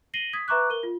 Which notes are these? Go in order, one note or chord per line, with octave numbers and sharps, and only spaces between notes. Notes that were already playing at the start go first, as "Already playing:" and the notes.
A#6 C7 D#7 F#7 G7
D#6 G#6 B6
B4 E5 A#5 C#6 D6 F#6
A#4 G7
F4